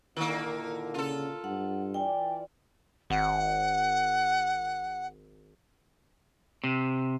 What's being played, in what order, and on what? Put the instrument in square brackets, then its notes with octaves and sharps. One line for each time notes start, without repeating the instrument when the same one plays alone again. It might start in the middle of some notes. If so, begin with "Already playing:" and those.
[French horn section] A#2 D3 [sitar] D#3 A#3 [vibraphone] E4
[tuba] C#3 [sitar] F4 A4
[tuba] G2 [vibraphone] F#5
[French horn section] E3 D5 [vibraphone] G5 G#5
[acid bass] G#1 [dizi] F#5
[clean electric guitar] C3